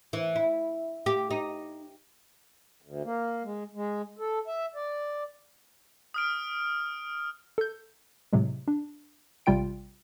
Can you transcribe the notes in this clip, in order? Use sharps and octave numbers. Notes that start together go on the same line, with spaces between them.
E3
E4
G4
D#4
D2
A#3
G#3
G#3
A4
E5
D5
D#6 F6 D7
A4 G6
A2 C3 F#3 G#3
D4
A1 C3 G3 F4 G5 D7